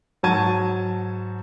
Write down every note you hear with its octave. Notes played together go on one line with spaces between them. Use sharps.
G#2 F#3 F#4 A5 G#6 D#7